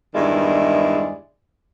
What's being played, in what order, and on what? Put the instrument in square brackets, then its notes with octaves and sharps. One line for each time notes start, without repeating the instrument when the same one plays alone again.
[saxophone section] E2 G2 D#3 G#3 E4 D5